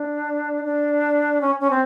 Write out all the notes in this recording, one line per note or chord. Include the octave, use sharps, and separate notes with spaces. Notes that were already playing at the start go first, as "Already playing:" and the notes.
Already playing: D4
D4
C#4
C#4
C4